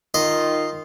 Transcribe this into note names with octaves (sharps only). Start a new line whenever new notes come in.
D#3 F4 D#5